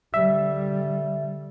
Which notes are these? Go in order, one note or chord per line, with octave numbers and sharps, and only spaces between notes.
D3 G3 E5